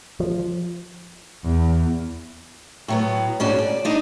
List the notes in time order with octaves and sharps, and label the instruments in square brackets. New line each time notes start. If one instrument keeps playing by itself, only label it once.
[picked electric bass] F3
[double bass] E2
[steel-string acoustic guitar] A2 F#3 B3
G#2 C#4 D4 F#4
D5
D4 D#4 D#5